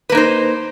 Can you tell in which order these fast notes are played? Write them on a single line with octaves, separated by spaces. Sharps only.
B4 A#3 D#4 C5